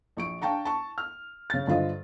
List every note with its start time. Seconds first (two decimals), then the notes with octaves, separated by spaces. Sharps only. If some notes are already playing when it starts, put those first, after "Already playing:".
0.17 A#1 C#6 D7
0.42 D4 F5 G5 A5 A#5 C#6
0.65 A5 C#6
0.98 F6
1.50 C#3 A6
1.67 G2 D3 F4 C5 D#5